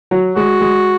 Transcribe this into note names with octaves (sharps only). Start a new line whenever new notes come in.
F#3
G#3 F#4
G#3